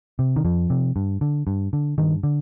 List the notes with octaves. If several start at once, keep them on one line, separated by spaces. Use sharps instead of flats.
C3
D#3
F2 F3
C3
G2
D3
G2
D3
G2 D#3
D3